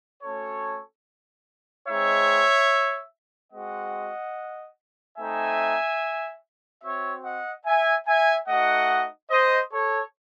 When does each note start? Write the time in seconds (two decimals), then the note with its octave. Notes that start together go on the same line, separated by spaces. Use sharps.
0.22 A3 C#4 F#4 A4 C#5
1.87 G#3 C4 D#4 C#5 E5
3.53 G#3 C4 F#4 D#5 F#5
5.18 A3 C4 D#4 E5 G#5
6.83 C4 F#4 C#5 E5
7.24 D#5 F#5
7.66 E5 G#5
8.07 E5 G#5
8.48 A3 D#4 F#4 D#5 F#5
9.30 C5 D#5
9.72 A4 C#5